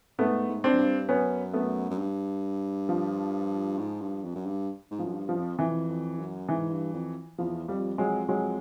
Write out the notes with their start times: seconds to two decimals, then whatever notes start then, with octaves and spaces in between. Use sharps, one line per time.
0.18 G#2 A3 B3
0.48 G#2
0.64 C4 D4
0.73 F#2
0.79 G2
1.09 F#2 B3 C#4
1.54 A3 B3
1.90 F#2
1.98 G2
2.89 F3
3.79 G#2
4.01 G2
4.24 F2
4.35 F#2
4.46 G2
4.91 G#2
4.99 F3
5.05 F#2
5.14 G2
5.29 F3
5.37 F2
5.59 F2 E3
5.89 F2
6.19 F#2
6.49 G#2 E3
6.71 G2
6.93 F2
7.38 E2 F3
7.68 F2 F3 G3
7.98 F2 F#3 G#3
8.29 F#3 G#3